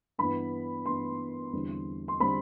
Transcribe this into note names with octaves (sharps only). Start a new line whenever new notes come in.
G2 E3 B3 B5
G2 E3 B3 C6
E2 D3 G3 C4
C6
D3 G3 C4 B5